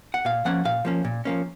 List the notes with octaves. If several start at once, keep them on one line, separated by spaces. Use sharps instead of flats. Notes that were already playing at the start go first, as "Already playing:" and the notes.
F#5
A#2 F5
F3 A#3 C#4 F#5
A#2 F5
F3 A#3 C#4
A#2
F3 A#3 C#4